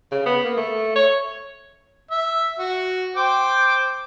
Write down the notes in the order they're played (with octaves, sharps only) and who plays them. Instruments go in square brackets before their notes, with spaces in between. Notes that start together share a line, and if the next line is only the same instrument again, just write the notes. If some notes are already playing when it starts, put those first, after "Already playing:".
[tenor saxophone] C#3
B3
A#3
A3
C#5
[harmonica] E5
F#4
C5 G5 D6